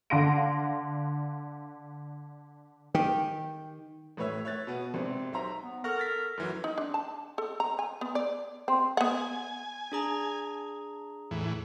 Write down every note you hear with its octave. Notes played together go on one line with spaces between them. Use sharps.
D3 F5 F#5 C6 A#6 D7
D#3 G4
A1 A2 B4 C#5 E5 E6
C#5 E5 F#6 A6
B2 B3
G#1 C3 C4
B1 C5 E5 A#5
B3
A4 A#4 F#5 C#6 F6
A6 B6
F#2 E3 F#3
D#4
D4
A5
A4
A#5
G#5
B3
D5
C4
B3 F#5 G#5
D4 G#4 A#5
E2 A2 E3